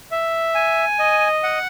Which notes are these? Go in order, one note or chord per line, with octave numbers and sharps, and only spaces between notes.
E5
G#5
D#5
F#5